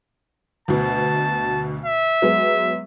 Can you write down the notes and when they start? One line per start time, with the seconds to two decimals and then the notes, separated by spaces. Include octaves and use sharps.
0.68 D2 B2 A5
1.85 E5
2.22 F#3 G#3 B3